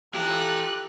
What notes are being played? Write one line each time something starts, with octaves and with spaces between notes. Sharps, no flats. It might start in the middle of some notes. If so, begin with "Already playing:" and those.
E3 E4 F4 G4 A4 A#5 F#6